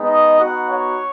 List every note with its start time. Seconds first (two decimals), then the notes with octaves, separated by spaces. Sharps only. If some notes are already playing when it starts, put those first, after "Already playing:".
Already playing: G#3 B3 D#4
0.08 D#5
0.39 B3 D#4 F#4 F#5
0.70 C#5